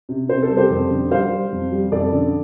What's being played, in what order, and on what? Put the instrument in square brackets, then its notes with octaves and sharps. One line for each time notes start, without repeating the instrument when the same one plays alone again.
[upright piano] C3
C3 C5
A4
G3
G4 C5
F2
D3
G3 C5 F5
G3
F2
G3
F2 A4 D5
D3